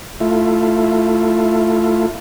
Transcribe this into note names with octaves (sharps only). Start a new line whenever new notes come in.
A3 E4 F4